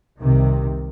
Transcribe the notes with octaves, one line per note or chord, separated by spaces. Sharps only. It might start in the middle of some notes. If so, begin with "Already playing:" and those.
C2 C3 D#3